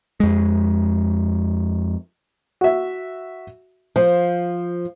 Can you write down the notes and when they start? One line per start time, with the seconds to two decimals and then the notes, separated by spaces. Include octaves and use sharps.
0.20 F2 G#3
2.61 F#4 E5
3.96 F3 C5